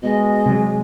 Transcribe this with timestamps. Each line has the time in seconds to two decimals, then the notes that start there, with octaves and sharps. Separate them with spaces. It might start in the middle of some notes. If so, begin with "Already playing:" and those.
0.02 B2 G#3 D#5
0.46 C3 F#3